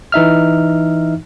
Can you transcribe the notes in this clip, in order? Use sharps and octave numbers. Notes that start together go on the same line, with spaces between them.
E3 D#4 E5 F6